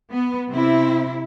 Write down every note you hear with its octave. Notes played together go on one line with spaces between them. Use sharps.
B3
C3 C4 E4